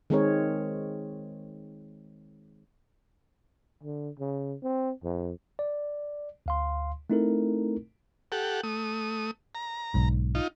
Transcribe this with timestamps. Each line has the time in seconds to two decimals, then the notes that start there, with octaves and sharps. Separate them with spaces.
0.10 D#3 G#3 C4 G#4 A#4 C#5
3.83 D3
4.19 C#3
4.63 C4
5.04 F2
5.59 D5
6.46 D2 F5 C6
7.10 A3 C4 D#4 E4 A4 A#4
8.32 G4 A4 F#5
8.63 A3 D#6
9.55 A#5
9.94 B1 G#2
10.35 D#4 F4